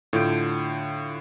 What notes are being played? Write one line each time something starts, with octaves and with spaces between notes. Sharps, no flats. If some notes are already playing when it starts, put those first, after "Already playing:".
A2 D3 F4 G6 D7